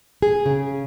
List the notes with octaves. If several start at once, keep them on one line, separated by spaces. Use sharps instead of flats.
G#4
C#3